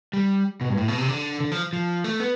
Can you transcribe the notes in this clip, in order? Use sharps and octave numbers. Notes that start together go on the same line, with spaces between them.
G3
B2
G2
A2
B2
C3
D3
D3
F3
F3
A3
B3